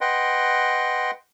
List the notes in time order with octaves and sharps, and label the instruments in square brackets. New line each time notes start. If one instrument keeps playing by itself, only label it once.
[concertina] B4 D#5 F#5 G5 C6